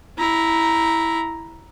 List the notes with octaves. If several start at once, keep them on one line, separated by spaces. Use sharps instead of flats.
E4 A#5